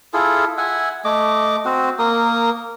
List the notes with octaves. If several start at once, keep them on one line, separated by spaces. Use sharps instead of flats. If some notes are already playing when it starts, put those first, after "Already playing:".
E4 F4 G#4 A4
E5 F#5 G#5
A3 D#5 D6
C4 F#4
A#3 A#4 D#6